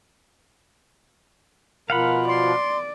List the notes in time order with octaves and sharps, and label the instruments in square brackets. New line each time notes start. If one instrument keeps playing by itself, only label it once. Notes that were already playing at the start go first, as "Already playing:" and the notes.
[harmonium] B2 F3 [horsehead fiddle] A#4 [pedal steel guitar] F5 F#5 B5
[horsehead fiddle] D5 [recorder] C6